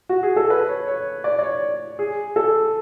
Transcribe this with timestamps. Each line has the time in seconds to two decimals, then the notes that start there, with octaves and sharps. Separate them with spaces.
0.09 F#4
0.23 G#4
0.36 A4
0.50 B4
0.69 C#5
0.88 C#5
1.24 D5
1.39 D5
1.43 C#5
1.99 G#4
2.36 A4